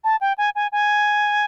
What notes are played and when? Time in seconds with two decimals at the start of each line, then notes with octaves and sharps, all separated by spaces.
0.04 A5
0.21 G5
0.38 G#5
0.55 G#5
0.72 G#5